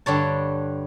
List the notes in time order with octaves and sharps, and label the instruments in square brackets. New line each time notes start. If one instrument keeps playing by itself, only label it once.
[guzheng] G2 D3 C#5 A5